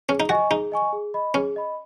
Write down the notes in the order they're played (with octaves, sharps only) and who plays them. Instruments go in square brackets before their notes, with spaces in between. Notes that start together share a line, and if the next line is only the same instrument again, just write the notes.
[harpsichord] C#4 [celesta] G#4
[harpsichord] D#4
[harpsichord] F#4 [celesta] D#5 G#5 C#6
[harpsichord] D#4 [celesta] G#4
[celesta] D#5 G#5 C#6
G#4
D#5 B5
[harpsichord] C#4 [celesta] G#4
[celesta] D#5 B5